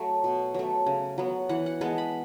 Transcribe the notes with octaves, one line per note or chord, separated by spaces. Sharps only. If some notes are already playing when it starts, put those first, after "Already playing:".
Already playing: F#3 A3
B2
F#3 A3
C#3
F#3 B3
E3 F#5
F#5
G#3 B3 A5
B5